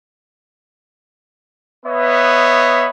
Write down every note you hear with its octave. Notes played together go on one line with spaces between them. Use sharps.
B3 B4 C#5 D#5 E5